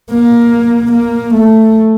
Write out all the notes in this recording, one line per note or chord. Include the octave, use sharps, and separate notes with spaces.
A#3
A#3
A3